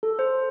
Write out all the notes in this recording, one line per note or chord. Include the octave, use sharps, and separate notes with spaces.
A4
C5